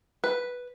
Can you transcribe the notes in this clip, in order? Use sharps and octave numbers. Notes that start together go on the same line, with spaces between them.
B4